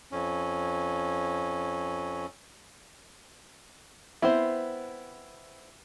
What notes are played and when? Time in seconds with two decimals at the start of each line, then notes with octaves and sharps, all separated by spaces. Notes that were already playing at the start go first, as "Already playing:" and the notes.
0.12 F2 C#4
4.22 B3 C4 E4 C5